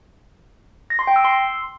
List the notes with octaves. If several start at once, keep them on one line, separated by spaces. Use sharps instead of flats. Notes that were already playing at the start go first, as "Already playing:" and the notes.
A#6
C6
G5
E6
C6